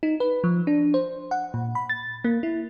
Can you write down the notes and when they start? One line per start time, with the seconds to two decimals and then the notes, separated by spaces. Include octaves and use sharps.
0.03 D#4
0.20 B4
0.44 F3
0.67 D4
0.94 C5
1.31 F#5
1.54 A#2
1.75 B5
1.90 A6
2.24 A#3
2.43 E4